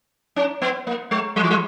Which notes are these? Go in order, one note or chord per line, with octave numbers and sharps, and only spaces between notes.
C#4
B3
A#3
G#3
G3
E3
G3